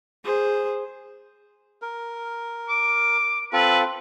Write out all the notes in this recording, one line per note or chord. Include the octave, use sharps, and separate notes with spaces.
G#4 C5
A#4
D6
C4 F4 A4 B4